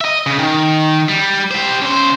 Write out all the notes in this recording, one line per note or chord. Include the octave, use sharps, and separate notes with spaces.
D#5 E5
C#3
D#3
G3
G3 C5
C#3 C5